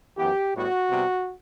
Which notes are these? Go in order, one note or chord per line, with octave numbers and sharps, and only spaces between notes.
F#2 E3 B3 G4
A2 G3 B3 F#4
C3 G3 B3